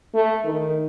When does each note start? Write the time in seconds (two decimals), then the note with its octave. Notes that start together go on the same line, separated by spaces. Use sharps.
0.14 A3
0.45 D#3